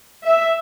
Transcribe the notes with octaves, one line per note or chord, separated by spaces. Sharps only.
E5